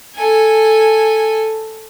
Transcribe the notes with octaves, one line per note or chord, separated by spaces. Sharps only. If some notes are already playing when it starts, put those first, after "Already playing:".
A4 G#5